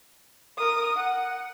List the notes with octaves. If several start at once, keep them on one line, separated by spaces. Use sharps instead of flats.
A#4 D#6
F#5